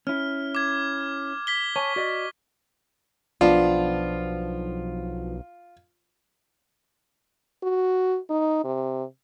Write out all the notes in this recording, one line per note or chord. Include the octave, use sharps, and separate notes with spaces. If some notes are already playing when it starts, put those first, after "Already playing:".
C#4 E4 F6
D6 G#6
G#6 B6 G7
C#5 G#5 A5 C#6
F#4 D5 D#5
B1 F3 B3 D4 F4
F#4
D#4
C3